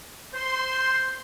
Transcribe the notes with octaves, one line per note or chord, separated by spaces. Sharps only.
C5 C6